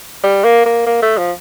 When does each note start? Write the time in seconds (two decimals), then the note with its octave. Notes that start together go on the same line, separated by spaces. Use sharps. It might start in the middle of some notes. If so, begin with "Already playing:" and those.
0.23 G3
0.44 A#3
0.66 A#3
0.86 A#3
1.02 A3
1.18 F3